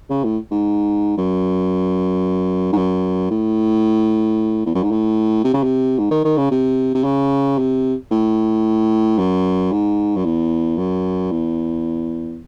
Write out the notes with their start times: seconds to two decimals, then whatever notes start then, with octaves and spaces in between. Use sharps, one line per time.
0.10 C#3
0.24 A2
0.51 G#2
1.18 F#2
2.73 G#2
2.77 F#2
3.31 A2
4.66 E2
4.75 F#2
4.83 G#2
4.91 A2
5.44 C3
5.54 C#3
5.63 C3
5.98 G#2
6.11 D#3
6.24 D#3
6.37 C#3
6.51 C3
6.95 C3
7.04 C#3
7.58 C3
8.11 A2
9.18 F#2
9.72 G#2
10.16 F#2
10.25 E2
10.78 F#2
11.31 E2